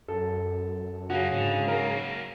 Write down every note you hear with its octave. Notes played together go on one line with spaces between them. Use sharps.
F#2 A4
C#3 A#3 C#4 F#4
G#2 D3
F#3 A#3 A#4